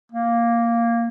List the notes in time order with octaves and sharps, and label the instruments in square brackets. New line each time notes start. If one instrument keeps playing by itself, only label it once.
[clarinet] A#3